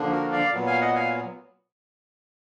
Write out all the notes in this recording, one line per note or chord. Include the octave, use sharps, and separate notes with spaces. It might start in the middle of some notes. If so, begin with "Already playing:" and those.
Already playing: D3 F3 A#3 D4
F#4 A#4
D5 F5
A#2 F#3 B3
F5 G#5
D#5 F#5
F5 G#5